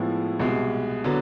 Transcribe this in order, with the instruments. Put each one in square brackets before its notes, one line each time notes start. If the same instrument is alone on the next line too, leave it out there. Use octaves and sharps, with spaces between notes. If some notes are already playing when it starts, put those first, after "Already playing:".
Already playing: [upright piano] A2 F3 G#3 B3 E4
C2 B2 G#3
D3 F#3 B3